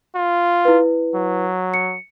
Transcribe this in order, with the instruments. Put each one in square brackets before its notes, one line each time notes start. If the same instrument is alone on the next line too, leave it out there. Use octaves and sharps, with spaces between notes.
[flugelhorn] F4
[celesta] E4 B4
[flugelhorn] F#3
[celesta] C#7